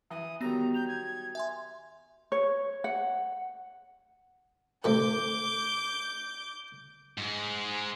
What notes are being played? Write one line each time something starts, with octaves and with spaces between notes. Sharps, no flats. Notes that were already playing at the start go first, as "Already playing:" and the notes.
E3 D#6
D#3 F#3 G3 B3 A#5 A#6
G6 F7
G#6
E5 G#5 C6
C#5
F#5
A2 C3 D#3 D6 G6
G#2 G#3